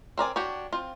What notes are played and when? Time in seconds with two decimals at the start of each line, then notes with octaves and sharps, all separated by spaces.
0.18 C4 A#4 D5 G#5
0.36 D4 F#4 G4 C#5
0.73 C4 F4